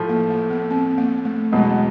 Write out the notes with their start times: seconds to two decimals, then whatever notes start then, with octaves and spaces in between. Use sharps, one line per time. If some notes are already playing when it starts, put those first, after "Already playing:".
Already playing: A2 F3 A3
0.09 A#3
0.30 A#3
0.50 B3
0.71 C4
0.98 A#3
1.25 A3
1.52 E2 B2 F#3 G#3 B3